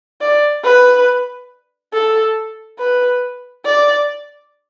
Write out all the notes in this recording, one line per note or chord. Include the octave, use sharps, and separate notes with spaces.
D5
B4
A4
B4
D5